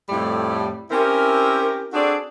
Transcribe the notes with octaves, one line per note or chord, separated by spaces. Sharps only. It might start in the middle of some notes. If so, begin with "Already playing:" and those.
F2 A2 G3 A3 G4
C4 C#4 E4 G4 A#4
C4 D4 F#4 G#4 A4 D5